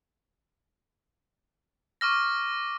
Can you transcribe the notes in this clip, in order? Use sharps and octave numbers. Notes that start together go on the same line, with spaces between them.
C#6 D6 F6 A#6